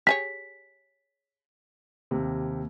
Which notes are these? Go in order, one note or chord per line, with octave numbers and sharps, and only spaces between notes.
G4 G#4 C#5 B6
D#2 C3